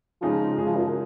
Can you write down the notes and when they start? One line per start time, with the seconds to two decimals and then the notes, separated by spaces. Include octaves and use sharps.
0.22 C#3 F3 G#3 D#4 G#4
0.57 C#3 G#3 D#4 G#4
0.67 F3
0.76 F#2